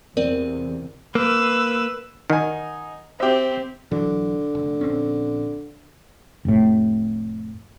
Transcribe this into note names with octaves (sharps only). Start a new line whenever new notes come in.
E2 C3 C4 A#4 D5
A#3 B4 E6
D#3 D#4 F#5 G#5
C4 G4 C5 E5
B1 D3 E3 F#3
F1
A#1 C4 C#4
F1 A2